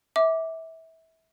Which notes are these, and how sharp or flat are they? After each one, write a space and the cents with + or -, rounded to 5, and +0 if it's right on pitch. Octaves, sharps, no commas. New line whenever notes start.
E5 -25 D6 +0